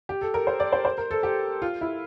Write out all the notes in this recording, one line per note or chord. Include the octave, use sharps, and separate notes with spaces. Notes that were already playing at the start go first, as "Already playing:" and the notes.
G4
A4
A#4
C5
D5
C5
C5
A#4
A4
G4
F4
E4